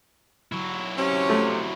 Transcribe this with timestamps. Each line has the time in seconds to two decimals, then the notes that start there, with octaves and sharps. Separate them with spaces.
0.52 F#3 E4
0.98 C3 C#4
1.29 A3